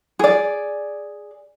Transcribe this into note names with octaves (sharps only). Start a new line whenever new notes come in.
G#4 D5